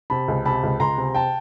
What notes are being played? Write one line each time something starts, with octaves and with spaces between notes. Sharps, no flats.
C3 A5 B5
C#2
C3 A5 B5
C#2
C#2 A#5 C6
C3
G5 A5